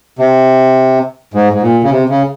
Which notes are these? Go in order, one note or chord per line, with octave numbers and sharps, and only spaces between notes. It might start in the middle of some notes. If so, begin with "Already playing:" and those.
C3
G#2
G#2
A#2
C#3
C3
C#3